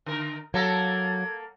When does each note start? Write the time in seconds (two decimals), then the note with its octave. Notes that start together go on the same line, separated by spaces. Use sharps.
0.06 D3 A#4
0.54 F#3 A#3 A4 A#4 G#6